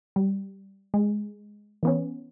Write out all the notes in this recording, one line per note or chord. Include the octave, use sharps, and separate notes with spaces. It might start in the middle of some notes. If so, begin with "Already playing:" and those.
G3
G#3
E3 B3 C#4